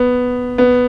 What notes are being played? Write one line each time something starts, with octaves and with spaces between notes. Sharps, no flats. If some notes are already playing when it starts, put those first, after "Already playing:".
Already playing: B3
B3